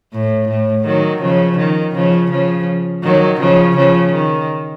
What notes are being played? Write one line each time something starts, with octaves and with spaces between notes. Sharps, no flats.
A2
A2
D#3 F#3
C#3 F3
D#3
C#3 F3
C#3 F3
D#3 F#3
C#3 F3
C#3 F3
D#3